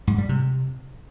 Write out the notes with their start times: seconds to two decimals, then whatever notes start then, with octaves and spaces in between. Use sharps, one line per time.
0.07 G#2
0.18 G3
0.29 C3